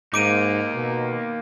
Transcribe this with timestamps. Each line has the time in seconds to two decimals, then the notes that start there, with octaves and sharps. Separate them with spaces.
0.14 G#2 A#3 D#4 D6 D7 D#7
0.75 B2